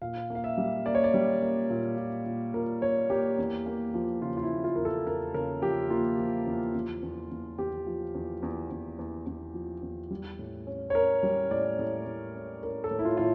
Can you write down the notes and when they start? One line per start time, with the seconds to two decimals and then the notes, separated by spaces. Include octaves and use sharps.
0.02 A#2 F5
0.30 A#3
0.35 F5
0.44 E5
0.57 G3
0.86 A#3 D5
0.95 C#5
1.04 D5
1.14 G3
1.42 A#3
1.70 A#2
1.97 A#2
2.26 A#2
2.54 A#2 A#4
2.82 A#3 C#5
3.10 A#3 G4
3.38 E2
3.66 A#3
3.94 F3
4.22 C#3 F4
4.37 F4
4.43 E4
4.51 A#3
4.64 F4
4.76 E2 A#4
4.85 A4
5.06 E2 A#4
5.34 C#3 A#4
5.62 F3 G4
5.90 A#3 F4
6.18 F3
6.47 E2
6.74 E2
7.03 E2
7.31 E2
7.58 E2 G4
7.87 F3
8.15 E2
8.43 E2
8.71 E2
8.99 E2
9.26 E2
9.54 F3
9.83 E2
10.10 G3
10.39 A2
10.67 C#4
10.90 C#5
10.95 C#4 A#4
11.23 G3
11.51 A2 D5
11.79 A2
12.07 A2
12.35 C#4
12.63 C#4 A#4
12.84 A4
12.91 A2
12.99 E4
13.05 F4
13.17 A2 F4